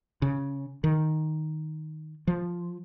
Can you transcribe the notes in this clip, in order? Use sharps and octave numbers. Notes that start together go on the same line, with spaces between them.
C#3
D#3
F3